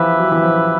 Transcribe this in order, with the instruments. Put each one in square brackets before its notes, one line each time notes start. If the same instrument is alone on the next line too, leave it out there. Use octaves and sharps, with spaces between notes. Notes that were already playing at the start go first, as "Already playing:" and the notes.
Already playing: [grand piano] E3 F3 [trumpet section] E4 G4 B4 E5
[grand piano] F#3
E3
F3